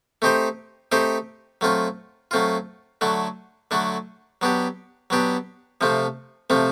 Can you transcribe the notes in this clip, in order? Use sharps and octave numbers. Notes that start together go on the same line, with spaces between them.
A3 C4 D#4 G4 C5
A3 C4 D#4 G4 C5
F#3 A3 C4 F4
F#3 A3 C4 F4
D3 F#3 A3 D4
D3 F#3 A3 D4
F#3 B3 D4 G4
F#3 B3 D4 G4
C3 F3 A3 C4
C3 F3 A3 C4